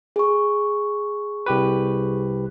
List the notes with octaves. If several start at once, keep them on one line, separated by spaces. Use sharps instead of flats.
G#4 C#6
C2 G4 B4